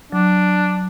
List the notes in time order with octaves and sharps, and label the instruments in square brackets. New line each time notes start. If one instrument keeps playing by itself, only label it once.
[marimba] F#3 [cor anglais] D4